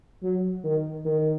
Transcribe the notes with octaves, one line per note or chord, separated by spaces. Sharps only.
F#3
D#3
D#3